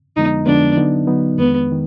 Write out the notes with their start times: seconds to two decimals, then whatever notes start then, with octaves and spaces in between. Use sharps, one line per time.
0.16 F2 D3 F3 G#3 B3 D#4
0.46 F2 D3 F3 G#3 B3 D4
0.77 D3 F#3 B3 D#4
1.07 D3 F#3 B3 D#4
1.38 F2 D#3 G#3 B3
1.72 D#3